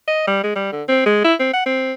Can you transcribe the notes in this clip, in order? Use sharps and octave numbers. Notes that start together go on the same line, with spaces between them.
D#5
G3
G#3
G3
D3
C4
G#3
E4
C4
F#5
C4